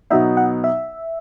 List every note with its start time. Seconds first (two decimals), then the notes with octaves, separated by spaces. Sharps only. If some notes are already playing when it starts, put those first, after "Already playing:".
0.10 B2 F#3 B3 D#4 E5
0.37 F#5
0.64 E5